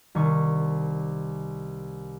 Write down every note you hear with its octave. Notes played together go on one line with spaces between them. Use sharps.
C2 D#3 C#6